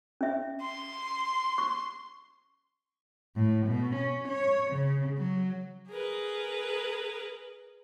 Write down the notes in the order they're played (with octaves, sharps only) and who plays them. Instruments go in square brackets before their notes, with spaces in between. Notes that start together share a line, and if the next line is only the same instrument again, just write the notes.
[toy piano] C#4 E5
[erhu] C6
[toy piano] C#6
[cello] A2
B2
C#4
C#5
C#3
F#3
[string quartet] G#4 A#4 B4